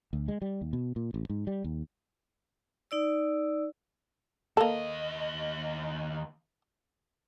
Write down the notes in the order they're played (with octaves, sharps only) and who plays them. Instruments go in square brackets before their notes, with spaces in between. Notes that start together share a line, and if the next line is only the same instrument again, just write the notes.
[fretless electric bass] D2
G#3
G3
D#2
B2
A#2
A1
G#2
G3
D#2
[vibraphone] D#4 D5 E6
[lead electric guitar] D#2 D#5 [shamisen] A#3 A4